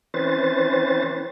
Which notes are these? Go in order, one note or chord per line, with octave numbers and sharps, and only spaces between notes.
E3 C4 C#4 B4 C5 A6